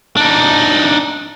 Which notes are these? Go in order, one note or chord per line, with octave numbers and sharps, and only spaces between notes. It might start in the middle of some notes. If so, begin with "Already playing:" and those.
D4 D#4